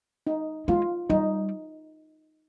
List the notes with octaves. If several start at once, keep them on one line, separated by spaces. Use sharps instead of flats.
D#4
G#3 F4
G3 D#4